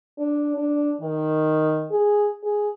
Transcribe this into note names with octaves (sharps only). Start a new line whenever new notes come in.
D4
D4
D#3
G#4
G#4